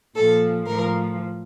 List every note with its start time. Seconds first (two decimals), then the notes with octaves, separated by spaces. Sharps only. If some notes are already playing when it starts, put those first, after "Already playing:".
0.15 A#2 F3 A4
0.66 A2 F3 A#4